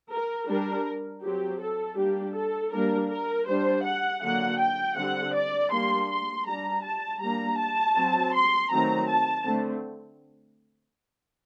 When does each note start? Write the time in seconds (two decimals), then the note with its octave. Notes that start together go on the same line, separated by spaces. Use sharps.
0.11 A#4
0.48 G3 D4 A#4
1.23 F#3 C4 G4
1.60 A4
1.98 G3 A#3 D4 G4
2.35 A4
2.72 G3 A#3 D4 A#4
3.10 A#4
3.47 G3 D4 C5
3.84 F#5
4.22 D3 F#3 A#3 F#5
4.59 G5
4.97 D3 G3 C4 F#5
5.34 D5
5.72 G3 A#3 D4 C6
6.10 C6
6.46 G3 D4 A#5
6.83 A5
7.21 G3 A#3 D4 A#5
7.59 A5
7.96 F#3 C4
8.34 C6
8.71 D#3 F#3 A3 C4 A#5
9.08 A5
9.45 D3 A3 C4